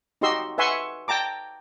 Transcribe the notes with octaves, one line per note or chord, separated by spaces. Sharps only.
D#4 F#4 G4 D#5 C6 E6
B4 E5 F#5 G#5 C6 C#6
G5 A5 A#5 D6